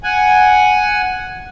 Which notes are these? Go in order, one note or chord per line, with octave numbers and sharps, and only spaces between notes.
F#5 G#5